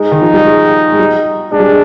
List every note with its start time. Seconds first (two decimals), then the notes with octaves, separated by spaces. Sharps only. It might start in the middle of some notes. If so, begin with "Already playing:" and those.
Already playing: G#3 D#4
0.11 D#3
0.22 F3
0.34 G3
0.44 G#3
0.92 G#3
0.99 G3
1.52 G#3 D4
1.60 G3
1.68 G#3